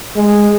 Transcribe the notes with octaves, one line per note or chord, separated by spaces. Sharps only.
G#3